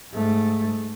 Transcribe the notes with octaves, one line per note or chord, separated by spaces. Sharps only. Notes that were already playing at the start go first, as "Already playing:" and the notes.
G#2 A3